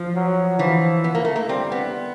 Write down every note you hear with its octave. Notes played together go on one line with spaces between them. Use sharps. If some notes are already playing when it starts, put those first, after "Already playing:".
Already playing: F3
F#3
E3 F3
B3
A#3
A3
A#3
G3 C4
B3